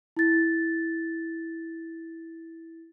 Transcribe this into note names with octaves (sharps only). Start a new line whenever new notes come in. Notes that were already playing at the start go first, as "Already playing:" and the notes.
E4 A6